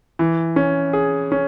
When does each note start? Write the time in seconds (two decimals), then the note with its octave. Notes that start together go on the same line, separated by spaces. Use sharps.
0.19 E3
0.56 C#4
0.93 G#4
1.32 C#4